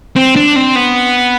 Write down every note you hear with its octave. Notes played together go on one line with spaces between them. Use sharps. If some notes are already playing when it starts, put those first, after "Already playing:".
C4
D4
C4
B3